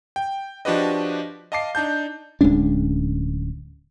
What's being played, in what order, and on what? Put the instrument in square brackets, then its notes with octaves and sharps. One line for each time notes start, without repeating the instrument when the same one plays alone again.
[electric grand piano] G5
F3 D4 F#4 G4 B4 D#5
D#5 F5 A5 D6 C7
D4 D#4 A5 G6
[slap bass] D1 G#3 C#4 D4